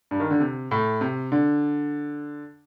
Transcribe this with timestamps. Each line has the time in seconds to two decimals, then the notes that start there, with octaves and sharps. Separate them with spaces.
0.11 G2
0.20 D#3
0.31 D3
0.40 C3
0.71 A2
1.01 C3
1.32 D3